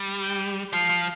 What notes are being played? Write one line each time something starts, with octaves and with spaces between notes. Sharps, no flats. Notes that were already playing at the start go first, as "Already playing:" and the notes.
Already playing: G3
G5
F3 F5
F3